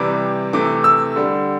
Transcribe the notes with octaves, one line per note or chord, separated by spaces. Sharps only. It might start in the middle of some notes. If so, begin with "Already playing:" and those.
Already playing: C3 E3 G3 D6
C3 E3 A3 D6
E6
D3 G3